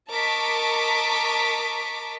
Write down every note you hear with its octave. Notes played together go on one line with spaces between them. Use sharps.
A#4 D#5 A5 C#6 D6 B6